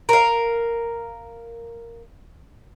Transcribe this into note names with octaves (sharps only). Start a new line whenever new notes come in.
A#4 F5